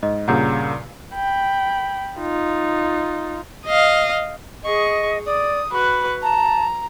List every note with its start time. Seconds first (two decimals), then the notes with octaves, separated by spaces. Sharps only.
0.03 G#2 D#5
0.28 G2 A#2 C#3 F#5 A#5 G6
1.14 G5 B5
2.19 D#4 F4
3.67 D#5 F5
4.63 G#4 D#5 C#6
5.26 D5 D#6
5.71 F#4 B4 B5
6.23 A5 A#5